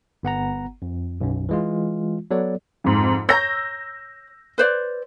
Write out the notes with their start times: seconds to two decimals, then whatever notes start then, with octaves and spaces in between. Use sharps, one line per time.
0.23 G1 B3 F#5 A#5
0.82 F2
1.21 B1 F#2
1.49 E3 G#3 F4
2.31 F#3 B3 A4 C#5 D5
2.84 F2 G#2
3.29 C#5 A#5 E6 G6 A#6
4.58 B4 C5 D5